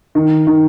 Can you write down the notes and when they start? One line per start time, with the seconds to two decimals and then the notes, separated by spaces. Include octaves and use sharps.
0.15 D#3
0.47 D#3